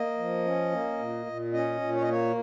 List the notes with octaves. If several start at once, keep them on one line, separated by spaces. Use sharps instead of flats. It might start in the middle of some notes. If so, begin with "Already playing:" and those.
Already playing: A#3 D#5
F3
C#4
A#3
A#2
A#2
C#4 D#5
A#2
C#5
D#5
A#3 C#5